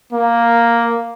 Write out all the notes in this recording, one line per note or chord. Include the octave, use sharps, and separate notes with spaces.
A#3